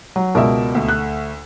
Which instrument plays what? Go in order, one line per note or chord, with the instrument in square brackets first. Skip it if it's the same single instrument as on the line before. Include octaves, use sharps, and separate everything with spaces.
[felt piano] F#3
[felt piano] C#2 B2 [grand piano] A#4 D5 E5
[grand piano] D2 A3
[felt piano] F#6